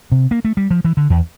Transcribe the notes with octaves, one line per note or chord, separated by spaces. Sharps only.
C3
A#3
A3
G3
F3
E3
D3
E2